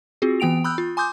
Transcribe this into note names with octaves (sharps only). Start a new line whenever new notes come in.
C4 F4 F#4 G#4
E3 B3 G5 D7 F7
B5 D#6 E6 F#6 G6
F4
G#5 C6 D6 D#6 G6